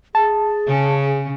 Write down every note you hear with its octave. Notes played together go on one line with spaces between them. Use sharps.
G#4 A5
C#3 C#4